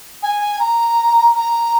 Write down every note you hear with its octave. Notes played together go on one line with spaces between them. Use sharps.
G#5
A#5
A#5